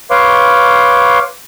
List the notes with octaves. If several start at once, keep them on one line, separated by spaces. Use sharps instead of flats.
B4 C#5 F5 C6 D6